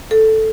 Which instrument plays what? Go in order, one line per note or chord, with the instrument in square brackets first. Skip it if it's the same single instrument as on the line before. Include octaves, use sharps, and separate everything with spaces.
[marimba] A4